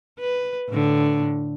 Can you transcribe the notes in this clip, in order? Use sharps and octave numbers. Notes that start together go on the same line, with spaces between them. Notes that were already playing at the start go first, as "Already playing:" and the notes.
B4
A2 D3